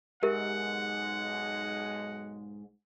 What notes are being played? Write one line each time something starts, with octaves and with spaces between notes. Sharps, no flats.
B1 G#2 G#3 G4 A#4 E5 F#5